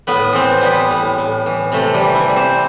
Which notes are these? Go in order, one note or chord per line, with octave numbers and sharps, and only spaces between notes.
A2 B3 B4
E3 C4 C5
G3 B3 B4
A2
A2
E3
C3 A3 A4
G3 G4
E3
E3 E4
G3
C4 C5